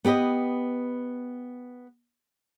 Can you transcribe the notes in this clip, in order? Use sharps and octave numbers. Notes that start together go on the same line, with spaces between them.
B3 G4 B4 D#5